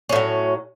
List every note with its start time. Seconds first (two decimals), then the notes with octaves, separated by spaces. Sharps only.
0.09 C#4
0.12 A2
0.16 F#3